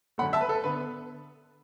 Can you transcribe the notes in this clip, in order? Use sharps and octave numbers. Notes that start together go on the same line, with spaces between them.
F#2 D3 A3 F#5 B5
E5 A5
B4
A4
D3 B3 B4